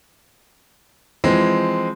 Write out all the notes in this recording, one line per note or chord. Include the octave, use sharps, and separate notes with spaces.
E3 F3 G#3 C4